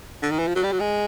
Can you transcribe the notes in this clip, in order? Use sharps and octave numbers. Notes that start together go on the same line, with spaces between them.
D3
D#3
E3
F3
F#3
G3
F#3
G#3